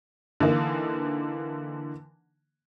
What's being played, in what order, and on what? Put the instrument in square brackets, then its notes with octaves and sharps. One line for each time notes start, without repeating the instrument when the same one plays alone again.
[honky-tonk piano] D3 E3 A#3 D#4